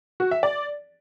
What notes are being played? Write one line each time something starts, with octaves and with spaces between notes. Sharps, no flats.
F#4
E5
D5